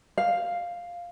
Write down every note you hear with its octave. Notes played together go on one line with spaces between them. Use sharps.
F5